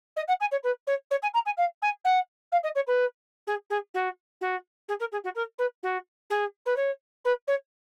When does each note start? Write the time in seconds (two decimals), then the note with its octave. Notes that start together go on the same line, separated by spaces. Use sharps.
0.16 D#5
0.28 F#5
0.40 G#5
0.51 C#5
0.63 B4
0.87 C#5
1.11 C#5
1.22 G#5
1.34 A#5
1.45 G#5
1.57 F5
1.82 G#5
2.04 F#5
2.52 F5
2.63 D#5
2.75 C#5
2.87 B4
3.47 G#4
3.70 G#4
3.94 F#4
4.41 F#4
4.88 G#4
4.99 A#4
5.12 G#4
5.24 F#4
5.35 A#4
5.58 B4
5.83 F#4
6.30 G#4
6.65 B4
6.76 C#5
7.24 B4
7.47 C#5